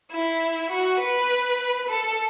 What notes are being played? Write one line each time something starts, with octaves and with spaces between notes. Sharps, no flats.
E4
F#4
B4
A4